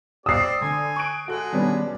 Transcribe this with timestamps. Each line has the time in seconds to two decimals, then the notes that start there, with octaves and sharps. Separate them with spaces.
0.26 C4 G4 D5 D#6 E6 C7
0.61 D3 G#5 A#5
0.96 C#6 F#6 D7
1.28 G#3 F#4 A4 F#6
1.53 B2 D#3 G3 B3 C#4 D4